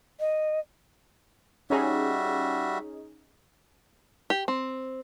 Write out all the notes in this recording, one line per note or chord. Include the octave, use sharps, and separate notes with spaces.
D#5
G3 C#4 D#4 F#4 G#4 E5
G4
C4